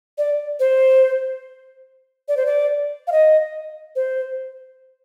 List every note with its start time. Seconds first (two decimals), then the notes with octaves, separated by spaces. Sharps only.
0.18 D5
0.60 C5
2.28 D5
2.37 C5
2.46 D5
3.07 F5
3.12 D#5
3.96 C5